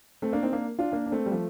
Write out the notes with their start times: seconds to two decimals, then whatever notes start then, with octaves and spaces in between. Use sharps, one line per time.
0.22 A3 C4
0.33 A#3 D4
0.43 C4 D#4
0.52 A#3 D4
0.79 D4 F4
0.92 A#3 D4
1.06 D4
1.12 A3 C4
1.26 G3
1.32 F3 A3